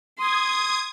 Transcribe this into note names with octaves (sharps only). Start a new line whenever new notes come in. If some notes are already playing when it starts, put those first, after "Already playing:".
C6 D#6 G#6